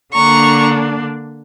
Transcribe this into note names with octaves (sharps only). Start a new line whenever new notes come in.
D3 A#3 D4 A#5 C#6